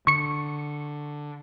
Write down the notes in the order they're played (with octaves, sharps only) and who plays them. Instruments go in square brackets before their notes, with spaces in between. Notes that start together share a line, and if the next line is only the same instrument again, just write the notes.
[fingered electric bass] D3 [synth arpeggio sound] C#6 C#7